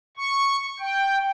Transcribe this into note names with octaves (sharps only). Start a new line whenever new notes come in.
C#6
G5